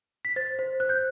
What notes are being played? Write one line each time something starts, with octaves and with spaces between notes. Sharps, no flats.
B6
C5 A6
C5
C5 F#6
G6